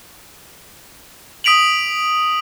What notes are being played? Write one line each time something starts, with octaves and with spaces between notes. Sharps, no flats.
D#6 B6 D7 F7 F#7